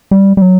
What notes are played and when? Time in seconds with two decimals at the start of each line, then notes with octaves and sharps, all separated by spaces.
0.11 G3
0.37 G3
0.42 F#3